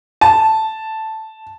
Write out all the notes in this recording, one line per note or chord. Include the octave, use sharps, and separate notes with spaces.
A5